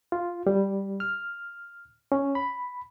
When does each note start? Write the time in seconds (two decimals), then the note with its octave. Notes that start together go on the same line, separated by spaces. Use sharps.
0.12 F4
0.47 G3
1.00 F6
2.12 C#4
2.35 B5